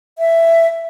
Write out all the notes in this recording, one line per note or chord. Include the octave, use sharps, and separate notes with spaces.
E5